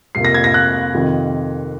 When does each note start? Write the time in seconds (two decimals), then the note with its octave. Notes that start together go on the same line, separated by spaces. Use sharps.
0.15 F2 C3 F3 A#3 C7
0.25 A#6
0.34 G#6
0.44 A#6
0.54 F#6
0.94 F2 C3 D#3